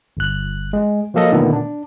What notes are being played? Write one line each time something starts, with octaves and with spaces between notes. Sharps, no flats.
G1 F#6
G#3
F3 F#3 A#3 A4 D#5
A#2 D3 D#3 A3 B3
D4